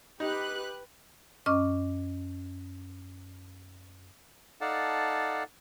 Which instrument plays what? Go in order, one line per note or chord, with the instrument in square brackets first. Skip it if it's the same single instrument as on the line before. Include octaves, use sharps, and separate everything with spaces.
[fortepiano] D#4 [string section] G4 B4 F#6
[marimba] F#2 C#4 D#5 C#6 D6 F6
[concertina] D#4 A4 D5 F5 F#5 A5